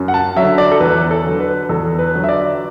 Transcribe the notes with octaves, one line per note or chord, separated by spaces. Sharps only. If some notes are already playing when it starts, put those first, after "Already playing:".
Already playing: F#2
F#5
A5
D3 F#3 E5
D5
A4
E2 B4
A4
D3 F#3
B4
E2 A4
B4
D3 F#3
E5
D5